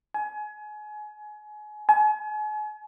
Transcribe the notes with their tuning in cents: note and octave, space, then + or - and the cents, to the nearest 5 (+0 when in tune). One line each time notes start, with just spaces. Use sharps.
G#5 +30
G#5 +40